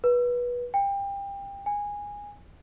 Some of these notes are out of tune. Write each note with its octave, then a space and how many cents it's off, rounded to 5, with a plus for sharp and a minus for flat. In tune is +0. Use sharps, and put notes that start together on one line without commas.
B4 -20
G5 +25
G#5 -15